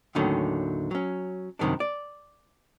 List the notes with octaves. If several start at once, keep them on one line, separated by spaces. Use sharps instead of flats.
D#2 A2 D3 D#3 F#3 C#4
F#3 C#4
F#2 C3 D#3 G3 D4
D5